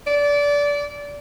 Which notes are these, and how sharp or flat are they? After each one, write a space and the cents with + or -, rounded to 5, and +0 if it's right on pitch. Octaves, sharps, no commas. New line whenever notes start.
D5 -25